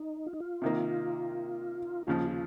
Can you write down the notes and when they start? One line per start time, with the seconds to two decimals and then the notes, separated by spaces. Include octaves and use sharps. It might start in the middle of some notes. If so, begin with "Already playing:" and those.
Already playing: D#4
0.26 F4
0.33 D#4
0.40 F4
0.62 C3 D#3 A#3
2.07 D#2 C#3 F3 F4
2.31 F4